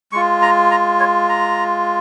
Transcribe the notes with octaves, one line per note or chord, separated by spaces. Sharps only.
G#3 F4 C#6
A#5
A#5
C#5
A#5